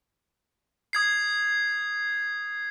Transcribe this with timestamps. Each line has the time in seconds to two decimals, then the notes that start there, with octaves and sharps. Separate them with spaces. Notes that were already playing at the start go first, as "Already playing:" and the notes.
0.93 D#6 G#6 C7